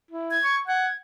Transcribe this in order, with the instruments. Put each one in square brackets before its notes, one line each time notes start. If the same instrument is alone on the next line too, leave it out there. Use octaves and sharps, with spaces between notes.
[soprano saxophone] E4
[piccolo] G#6
[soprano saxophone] C#6
[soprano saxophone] F#5 [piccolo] G#6